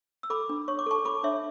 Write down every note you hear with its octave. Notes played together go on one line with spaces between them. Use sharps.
E6
A4 B5 D6
D4
C#5 C#6
D6
A4 A5 C#6
A4 B5 D6
D4 C#5 E5